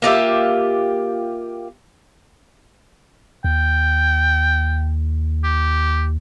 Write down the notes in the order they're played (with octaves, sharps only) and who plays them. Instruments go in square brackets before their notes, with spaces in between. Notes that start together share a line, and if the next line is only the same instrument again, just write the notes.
[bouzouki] A#3 F4 G4 E5
[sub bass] D#2 [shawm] G5
[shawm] G4